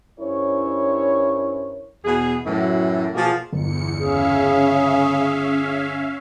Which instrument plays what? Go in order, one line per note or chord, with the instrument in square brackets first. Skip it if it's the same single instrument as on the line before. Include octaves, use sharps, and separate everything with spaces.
[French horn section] G2 C#4 E4 A#4 C5 C#5
[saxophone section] E2 B2 G#4
F#2 A2 E3 F#3
B2 F3 A#3 G#4
[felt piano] G1 [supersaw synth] E2 C#7
[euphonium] C#3 [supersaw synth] C#4 E5 F5 [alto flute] G#4